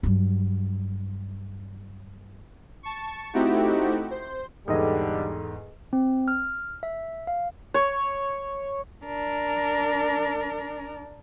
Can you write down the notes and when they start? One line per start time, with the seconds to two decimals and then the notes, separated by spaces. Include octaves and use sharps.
0.03 G2 F#3
2.83 A5 C#6
3.34 A3 C4 D#4 E4 F#4 G4
4.11 C5
4.68 E2 G#2 D3 G3 G#4 A4 D#5
5.93 C4
6.28 F6
6.83 E5
7.27 F5
7.74 C#5
9.05 D4 A#4